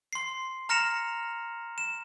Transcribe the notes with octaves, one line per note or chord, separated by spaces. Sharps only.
C6 C7
A#5 F6 A#6 C#7 E7 F7
E7